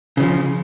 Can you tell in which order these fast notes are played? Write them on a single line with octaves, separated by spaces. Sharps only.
C#3 E3 F3